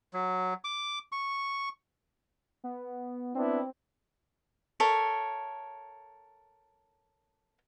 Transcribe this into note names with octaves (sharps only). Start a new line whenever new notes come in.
F#3
D6
C#6
B3
B3 C4 D4 E4
A4 A#4 C#5 E5